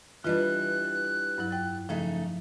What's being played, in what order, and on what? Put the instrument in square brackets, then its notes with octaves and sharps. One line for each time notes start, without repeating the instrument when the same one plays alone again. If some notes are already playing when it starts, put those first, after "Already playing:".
[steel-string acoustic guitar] E3 G3 D4 [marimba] F4 B4 D#5 [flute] F#6
[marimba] G2 F#3 E4
F2 G5 A6
[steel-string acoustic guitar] C#3 A3 D#4 [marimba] F3